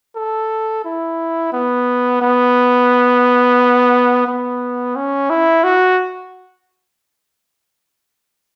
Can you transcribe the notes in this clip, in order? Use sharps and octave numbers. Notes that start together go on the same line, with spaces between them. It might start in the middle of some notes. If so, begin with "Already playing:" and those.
A4
E4
B3
B3
B3
C#4
E4
F#4